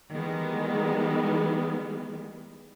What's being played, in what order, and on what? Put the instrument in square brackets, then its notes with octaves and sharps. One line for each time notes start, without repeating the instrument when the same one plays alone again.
[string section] D#3 E3 G3 G#3 B3